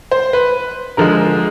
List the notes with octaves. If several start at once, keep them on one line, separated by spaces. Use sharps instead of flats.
C5
B4
D3 F3 G#3 A#4